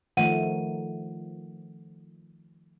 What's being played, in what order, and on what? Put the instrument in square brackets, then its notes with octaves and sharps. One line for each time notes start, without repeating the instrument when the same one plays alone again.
[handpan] D#3 F3 A3 [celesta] F#5 D#7